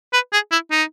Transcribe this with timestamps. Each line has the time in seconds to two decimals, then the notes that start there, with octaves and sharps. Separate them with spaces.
0.13 B4
0.33 G#4
0.52 E4
0.71 D#4